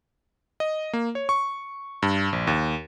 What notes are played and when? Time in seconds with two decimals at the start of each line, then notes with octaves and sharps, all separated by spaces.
0.60 D#5
0.93 A#3
1.15 C#5
1.29 C#6
2.02 G2
2.33 A#1
2.47 D#2